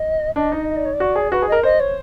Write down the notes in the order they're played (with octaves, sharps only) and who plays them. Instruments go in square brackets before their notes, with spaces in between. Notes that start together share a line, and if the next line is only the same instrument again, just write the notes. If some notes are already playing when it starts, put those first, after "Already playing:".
Already playing: [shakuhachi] D#5
[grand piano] D4 [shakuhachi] D#5
[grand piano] D#4
[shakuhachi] D#5
D5
C#5
D5
[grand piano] F#4
G#4
[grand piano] F#4 [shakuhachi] B4
[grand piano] G#4
[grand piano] A#4 [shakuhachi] D#5
[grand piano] C5 [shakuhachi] D#5
[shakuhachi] C#5